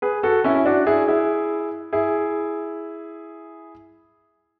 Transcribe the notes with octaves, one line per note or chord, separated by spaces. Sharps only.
G#4 B4
F#4 A4
C#4 E4
E4
D4 F#4
E4 G#4
E4 G#4
E4 G#4